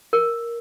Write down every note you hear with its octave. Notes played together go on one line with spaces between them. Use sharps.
A#4